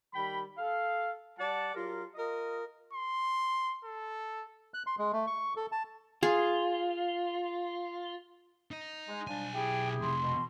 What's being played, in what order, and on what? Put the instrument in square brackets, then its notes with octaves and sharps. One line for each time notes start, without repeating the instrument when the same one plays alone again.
[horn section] D#3 G3 G5 B5
A4 F5
G3 D5 F#5 A5
F#3 F4 G4 A#4
F4 A#4 D#5
[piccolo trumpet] C6
A4
[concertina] F#6
C6
G#3
A3
C#6
A4
A5
[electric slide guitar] F4 [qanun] G#4
[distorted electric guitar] D#4 D#5
[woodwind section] G#3
[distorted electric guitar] B1 G#5 [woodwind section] F3 G3 D4
[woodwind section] E4 G4 G#4 [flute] G5
[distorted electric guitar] F2 C3 [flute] C6
[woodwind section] B2